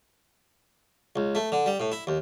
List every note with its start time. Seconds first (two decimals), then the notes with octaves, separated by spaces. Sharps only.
1.16 C#2
1.35 A3
1.52 D3
1.66 G3
1.80 A2
1.92 E4
2.07 D#2